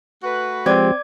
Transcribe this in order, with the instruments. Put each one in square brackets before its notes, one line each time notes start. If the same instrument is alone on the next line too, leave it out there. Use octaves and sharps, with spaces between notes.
[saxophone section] A3 F#4 B4
[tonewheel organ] F3 G#3 G4 [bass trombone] C4 [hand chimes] D5 D6 G#6